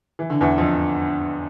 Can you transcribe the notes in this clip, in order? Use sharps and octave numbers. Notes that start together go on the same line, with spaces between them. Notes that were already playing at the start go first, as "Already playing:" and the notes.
E3
D3
E2 E3
F2 F3